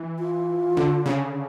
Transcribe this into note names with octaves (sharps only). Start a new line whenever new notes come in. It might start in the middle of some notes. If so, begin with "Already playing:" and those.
Already playing: E3
F4
D3
C#3